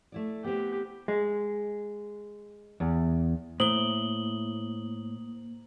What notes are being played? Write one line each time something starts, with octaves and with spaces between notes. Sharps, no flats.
A3 E4 D5
B3 C4 G4
G#3
E2
A2 A#3 C5 D#6 F#7 G7